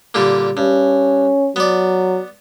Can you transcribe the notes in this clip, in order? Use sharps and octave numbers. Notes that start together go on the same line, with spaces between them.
A#2 D3 G3
G2 C#4
F#3 B3 D5